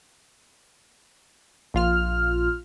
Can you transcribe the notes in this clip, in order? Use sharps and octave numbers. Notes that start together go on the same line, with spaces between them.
A#1 F4 F6